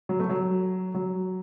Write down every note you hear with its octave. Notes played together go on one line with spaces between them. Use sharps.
F#3
A3
F#3
F#3